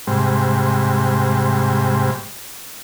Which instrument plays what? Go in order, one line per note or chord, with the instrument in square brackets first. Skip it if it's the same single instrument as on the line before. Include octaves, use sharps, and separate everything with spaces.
[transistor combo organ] G#2 C3 G3